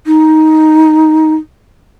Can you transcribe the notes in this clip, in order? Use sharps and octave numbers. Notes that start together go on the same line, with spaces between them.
D#4